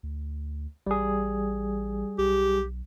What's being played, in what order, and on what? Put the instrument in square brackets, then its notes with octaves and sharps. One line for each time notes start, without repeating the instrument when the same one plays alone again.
[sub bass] D2
[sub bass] A1 [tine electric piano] G3 G#4
[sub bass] B1 [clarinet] G4